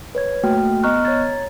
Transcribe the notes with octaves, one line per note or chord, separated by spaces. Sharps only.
B4 C#5 G#6
A3 A#3 F#4 G5 F6
B3 D#5 A#5 C#6 F6 F#6
C#5 A#5 G#6 A6